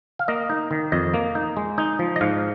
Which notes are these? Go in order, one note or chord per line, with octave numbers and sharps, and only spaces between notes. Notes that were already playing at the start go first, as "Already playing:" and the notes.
F5
A#3 D#5
D#4
D#3
F2 D#5
A#3
D#4
G#3
D#4
F3
D#5
G#2 F5